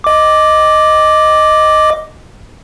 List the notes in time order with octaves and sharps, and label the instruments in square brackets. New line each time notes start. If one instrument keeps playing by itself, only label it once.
[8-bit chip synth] D#5 D6